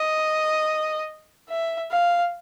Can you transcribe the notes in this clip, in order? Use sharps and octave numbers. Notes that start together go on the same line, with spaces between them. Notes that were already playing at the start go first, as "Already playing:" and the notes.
Already playing: D#5
E5
F5